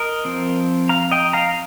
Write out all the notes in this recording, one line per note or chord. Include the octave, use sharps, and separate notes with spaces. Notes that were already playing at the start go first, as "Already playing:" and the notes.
Already playing: A#4 D#5
F3 C4
F5 A#5
D#5 G5
F5 A#5